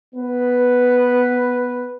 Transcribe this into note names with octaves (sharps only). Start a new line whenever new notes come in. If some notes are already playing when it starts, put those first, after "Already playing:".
B3 B4